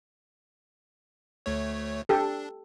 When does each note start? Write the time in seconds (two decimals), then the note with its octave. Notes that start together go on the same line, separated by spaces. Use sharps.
1.46 D2 A3 C#5
2.09 D4 G4 A4